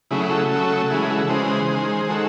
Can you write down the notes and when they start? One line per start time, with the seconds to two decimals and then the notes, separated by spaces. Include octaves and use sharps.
0.11 C#3 F#3 A3 E4 G#4
0.30 F#4 A4
0.51 C#3 F#3 A3
0.90 C#3 E3 G#3 E4 G#4
1.10 F#4 A4
1.29 C#3 E3 G#3 G#4 C5
1.69 D#3 G#3
2.09 D#3 G#3 F#4 A4